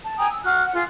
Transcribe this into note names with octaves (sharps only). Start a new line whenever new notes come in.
A5
G5 G#5 A#5 D#6
E6
F#4 F6 F#6
F#5
F4 G#4